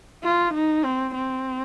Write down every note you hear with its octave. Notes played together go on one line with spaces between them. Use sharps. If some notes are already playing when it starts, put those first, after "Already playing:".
F4
D#4
C4
C4